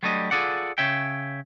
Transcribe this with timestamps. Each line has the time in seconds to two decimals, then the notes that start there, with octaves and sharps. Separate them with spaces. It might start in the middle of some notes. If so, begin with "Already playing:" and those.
0.03 F#3 G3 A3 D4 D#5
0.31 F4 G#4 A4 D5 F#5
0.78 C#3 C#5 E5 G5